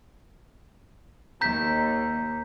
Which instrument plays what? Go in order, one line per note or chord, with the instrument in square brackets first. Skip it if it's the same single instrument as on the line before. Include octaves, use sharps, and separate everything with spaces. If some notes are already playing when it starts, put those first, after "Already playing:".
[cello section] D#2 [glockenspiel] A#5 G6 B6